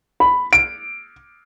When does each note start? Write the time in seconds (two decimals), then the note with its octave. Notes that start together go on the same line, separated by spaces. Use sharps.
0.20 B5
0.53 D7